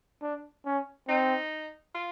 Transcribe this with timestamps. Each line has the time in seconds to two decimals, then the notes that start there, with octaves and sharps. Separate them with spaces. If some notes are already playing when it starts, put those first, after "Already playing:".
0.22 D4
0.66 C#4
1.08 C4 D#4
1.94 F4